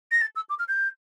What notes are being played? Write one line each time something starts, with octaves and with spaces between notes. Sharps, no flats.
A#6
A6
E6
D6
F6
G6